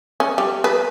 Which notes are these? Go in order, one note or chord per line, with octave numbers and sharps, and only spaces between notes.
C#4
G3
B4